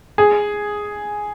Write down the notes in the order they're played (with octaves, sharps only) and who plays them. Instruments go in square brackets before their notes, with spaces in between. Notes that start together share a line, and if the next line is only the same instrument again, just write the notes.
[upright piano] G#4